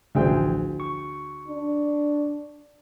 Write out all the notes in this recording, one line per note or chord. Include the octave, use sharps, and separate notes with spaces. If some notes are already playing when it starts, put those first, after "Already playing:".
A1 D2 E3 F3 G#4 G5
C#6
D4